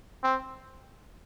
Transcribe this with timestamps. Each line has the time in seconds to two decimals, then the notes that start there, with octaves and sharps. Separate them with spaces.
0.23 C4